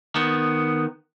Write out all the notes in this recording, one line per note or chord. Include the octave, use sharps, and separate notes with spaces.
D#3 B3